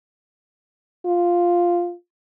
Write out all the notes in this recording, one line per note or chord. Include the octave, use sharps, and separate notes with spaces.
F4